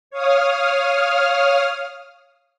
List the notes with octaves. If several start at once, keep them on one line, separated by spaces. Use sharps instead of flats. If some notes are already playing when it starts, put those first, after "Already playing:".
C#5 F5 D#6 F6